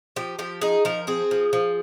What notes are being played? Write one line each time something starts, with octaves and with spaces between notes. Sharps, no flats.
F3 G4
F3 G4
D#4 G#4
F3 A#4
C4 G#4
F3
F3